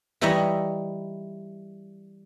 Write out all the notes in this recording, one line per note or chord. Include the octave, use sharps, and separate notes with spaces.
E3 G3 D#4 E4 C#5 D#5